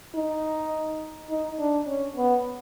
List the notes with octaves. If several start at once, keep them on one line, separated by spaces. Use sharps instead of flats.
D#4
D#4
D4
C#4
B3